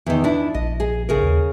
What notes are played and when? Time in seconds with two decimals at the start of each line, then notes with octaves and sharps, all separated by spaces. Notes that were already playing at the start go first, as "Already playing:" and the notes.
0.06 E2 D#3
0.24 D4 E4
0.54 A#1 D#5
0.80 G#4
1.09 C#3 G#4 A#4
1.21 D#2